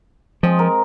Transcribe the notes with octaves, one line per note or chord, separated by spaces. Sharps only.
F3 G#3 C4 D#5
A#4 D#5